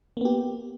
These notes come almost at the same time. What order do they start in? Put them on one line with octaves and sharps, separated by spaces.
A#3 B3 G4